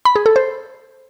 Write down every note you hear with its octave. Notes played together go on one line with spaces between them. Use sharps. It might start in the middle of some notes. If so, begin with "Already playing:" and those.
B5
G#4
A4
C5